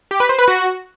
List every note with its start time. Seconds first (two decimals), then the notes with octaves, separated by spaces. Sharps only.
0.11 G4
0.20 B4
0.29 C5
0.39 B4
0.48 F#4